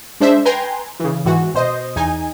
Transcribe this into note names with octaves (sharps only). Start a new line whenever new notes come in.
G#3 D4 C5 E5
B4 G5 G#5 A#5 C6
C#3 E3
G#2 E3 F#4
B2 C5 D#5
E2 D#4 G#5